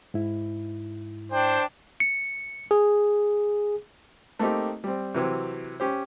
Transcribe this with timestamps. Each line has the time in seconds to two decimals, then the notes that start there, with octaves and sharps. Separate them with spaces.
0.14 G#2 E4
1.32 D4 C5 G5
2.00 C#7
2.71 G#4
4.39 A3 A#3 C4 D#4 G4
4.84 G3 C4
5.14 C3 E3 F#3 C4
5.80 C#4 G4 C5